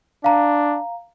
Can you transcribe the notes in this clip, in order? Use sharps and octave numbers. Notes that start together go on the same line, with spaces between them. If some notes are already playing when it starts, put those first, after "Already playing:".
D4 F5 A#5